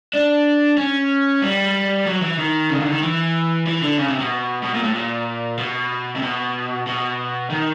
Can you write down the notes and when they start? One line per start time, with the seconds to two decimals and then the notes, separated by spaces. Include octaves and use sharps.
0.14 D4
0.77 C#4
1.42 G3
2.06 F#3
2.22 E3
2.38 D#3
2.70 C#3
2.80 D3
2.91 D#3
3.02 E3
3.66 E3
3.82 D3
3.98 C#3
4.09 C3
4.19 B2
4.63 B2
4.74 A#2
4.83 A2
4.94 A#2
5.58 B2
6.16 C3
6.23 B2
6.87 B2
7.50 D#3